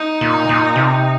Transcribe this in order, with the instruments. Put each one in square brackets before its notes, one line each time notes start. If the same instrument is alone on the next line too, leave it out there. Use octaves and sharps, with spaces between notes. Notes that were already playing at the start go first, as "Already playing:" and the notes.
Already playing: [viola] D#4
[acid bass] A#2
A#2
C3